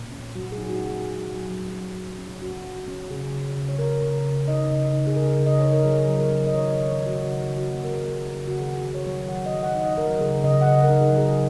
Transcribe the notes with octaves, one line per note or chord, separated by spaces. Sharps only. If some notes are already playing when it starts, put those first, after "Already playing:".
Already playing: A#2
C#4
F#3 F#4
G#4
D#4
F#4
D#4
G#4
F#3
F#3
F#3
C#4
F#3
C#4
C#4 F#4
F#3
C#4
C#3 G#4
C#4
C#3
C#5
C#4 A#4
C#3
C#3
D#4 D#5
C#3
D#4
G#4
C#3 A#4
C#3
D#5
D#4 C#5
A#4
F#3 G#4
F#3
A#4
C#4
D#5
D#3 C#5
C#5
F#3
C#5
F#3
F#4
C#3 F#4
C#3
F#4
A#3
A#4
C#4 G#4
A#3
C#3
F#4
D#3 G#4
D#3
C#5
F#3
D#3 F#5
D#5
D#3
F#5
D#4
D#5
F#3 A#4
C#3 G#4
C#3 D#5
F#5
C#3 D#5
A#4
D#4
G#4
F#3
G#4